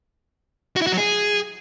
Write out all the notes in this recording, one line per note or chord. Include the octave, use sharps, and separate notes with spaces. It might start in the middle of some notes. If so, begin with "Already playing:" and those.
F#4
E4
F#4
F#3
G#4